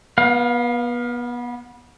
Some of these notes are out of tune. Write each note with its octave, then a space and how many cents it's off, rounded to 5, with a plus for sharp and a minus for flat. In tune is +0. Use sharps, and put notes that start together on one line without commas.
B3 -25 F5 +25